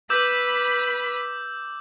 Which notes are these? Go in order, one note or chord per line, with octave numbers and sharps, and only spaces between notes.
B4 B5 D6 E6 G6